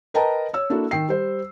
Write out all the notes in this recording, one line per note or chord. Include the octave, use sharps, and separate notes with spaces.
A#4 B4 D#5 G5 A5 A#5
C#5 E6
A#3 D4 E4 F#4 A4
D#3 G5 C7
G3 C5